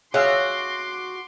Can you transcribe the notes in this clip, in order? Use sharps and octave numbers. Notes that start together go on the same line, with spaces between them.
F#4 G#4 C#5 E5 F5 C6 D6